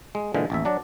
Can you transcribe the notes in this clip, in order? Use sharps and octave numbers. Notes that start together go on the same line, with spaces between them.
G#3
A#2 D3 E3 G#3
A1 D#2 E5
F#3 D4 D5